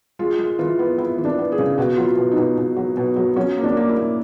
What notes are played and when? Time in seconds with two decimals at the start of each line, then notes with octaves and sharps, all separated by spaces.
0.19 G#3 F4
0.38 G#3
0.59 E3 F4
0.79 B3
0.98 B3 E4
1.18 E3
1.25 D4
1.39 B3
1.52 G#4
1.59 C#3
1.78 B2 F#4
1.96 F#3 F4
2.04 E4
2.17 B2
2.31 D#4
2.37 B2
2.57 B2
2.77 F#3
2.97 B2
3.16 F#3
3.36 F#3 C#4
3.57 A#3
3.64 D4
3.77 A#3
3.89 E4
3.97 A#3